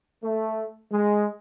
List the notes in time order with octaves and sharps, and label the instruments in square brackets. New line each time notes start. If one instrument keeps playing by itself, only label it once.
[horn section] A3
G#3